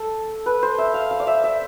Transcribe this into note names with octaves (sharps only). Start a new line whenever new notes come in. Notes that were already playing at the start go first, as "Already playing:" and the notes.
Already playing: A4
B4
C5
E5
F5
F5
D5
E5
E5